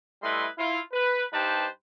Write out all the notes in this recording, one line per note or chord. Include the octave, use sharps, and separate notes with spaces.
G3 A3 E4 B4 D#5 C6
E4 F4
B4
G2 D#4 G4 B4 C5 A5